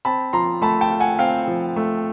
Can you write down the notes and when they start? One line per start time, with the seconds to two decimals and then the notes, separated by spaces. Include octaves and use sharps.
0.05 C4 A5 B5
0.33 F3 A#5 C6
0.61 A3 A5 B5
0.81 G5 A5
0.90 F4
1.00 F#5 G#5
1.19 C4 F5 G5
1.48 F3
1.76 A3